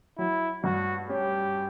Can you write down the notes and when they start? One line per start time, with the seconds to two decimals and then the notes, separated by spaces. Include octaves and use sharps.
0.18 F#3 E4
0.64 G2 F#4
1.09 C#4 G4